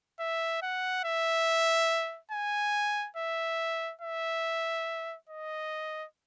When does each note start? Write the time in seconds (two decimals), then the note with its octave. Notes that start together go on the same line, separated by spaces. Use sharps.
0.20 E5
0.62 F#5
1.04 E5
2.32 G#5
3.17 E5
4.02 E5
5.29 D#5